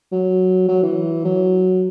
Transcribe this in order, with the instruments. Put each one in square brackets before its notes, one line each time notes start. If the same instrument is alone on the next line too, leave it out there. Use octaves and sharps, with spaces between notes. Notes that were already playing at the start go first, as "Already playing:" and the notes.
[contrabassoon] F#3
F#3
E3
F#3